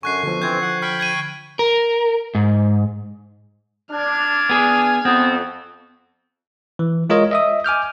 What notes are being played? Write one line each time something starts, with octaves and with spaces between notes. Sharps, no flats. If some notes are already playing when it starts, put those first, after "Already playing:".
F#2 D3 G#5 C#6 F#6 C7
B2 D3 F3
E3 C4 G6 G#6
F#5
G5 B5 C#6 F6
G#6 B6 D#7
A#4
G#2
D4 F6 G#6
B3 G#4
F2 B3 C4
E3
G#3 F4 A#4 C#5 D#5
D#5 E5 D#6
G#5 D6 F6 G6